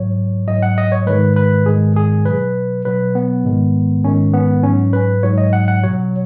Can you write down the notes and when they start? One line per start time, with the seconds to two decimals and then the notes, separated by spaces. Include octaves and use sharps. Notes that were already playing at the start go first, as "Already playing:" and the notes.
Already playing: G#2 F#3 C#5
0.48 G#2 F#3 D#5
0.63 F#5
0.78 D#5
0.92 C#5
1.07 G#2 D#3 G#3 B4
1.36 B4
1.66 G#2 D#3 G#3 G#4
1.96 G#4
2.25 B2 F#3 B4
2.85 B2 F#3 B4
3.15 B3
3.44 G#2 D#3 G#3
4.04 G#2 D#3 G#3 C#4
4.34 B3
4.63 G#2 F#3 C#4
4.93 B4
5.23 G#2 F#3 C#5
5.38 D#5
5.53 F#5
5.68 F#5
5.83 B2 F#3 C#5